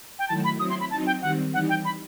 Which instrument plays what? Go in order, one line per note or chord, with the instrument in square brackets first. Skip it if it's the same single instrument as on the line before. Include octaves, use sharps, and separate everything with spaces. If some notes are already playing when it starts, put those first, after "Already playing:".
[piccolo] G5
[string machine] D#3 F#3 A3 E4 [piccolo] A5
[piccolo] B5
[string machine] F#3 C4 E4 [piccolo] D#6
[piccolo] C6
B5
[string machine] F#3 C4 D#4 [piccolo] A5
[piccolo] G5
[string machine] D#3 G3 C4 [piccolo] F#5
[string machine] E3 G3 D#4 [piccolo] F#5
[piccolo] G5
B5